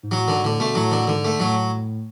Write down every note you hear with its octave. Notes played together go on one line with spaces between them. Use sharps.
G#2
A2 F#3
G#2 D3
A2 D3
B2 A3
A2 F#3
D3
G#2 D3
A3
A2 F#3